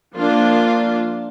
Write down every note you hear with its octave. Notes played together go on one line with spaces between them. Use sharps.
F3 A#3 D4 F4